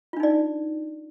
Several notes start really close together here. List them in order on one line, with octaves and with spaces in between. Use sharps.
F4 D4 D#4 D5